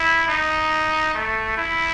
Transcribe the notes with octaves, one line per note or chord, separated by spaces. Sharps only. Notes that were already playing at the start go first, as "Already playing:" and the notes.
Already playing: E4
D#4
A3
E4